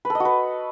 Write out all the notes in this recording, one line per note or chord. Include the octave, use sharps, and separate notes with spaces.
B4
A4
D#5
F#4
B4